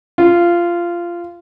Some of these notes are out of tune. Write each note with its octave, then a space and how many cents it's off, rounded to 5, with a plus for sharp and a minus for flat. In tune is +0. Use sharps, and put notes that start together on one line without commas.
F4 -15